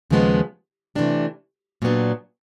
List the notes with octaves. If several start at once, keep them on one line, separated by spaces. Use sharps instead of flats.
D#2 C#3 F3 G#3 B3
C3 E3 A3 D4 G4
A#2 F#3 B3 D4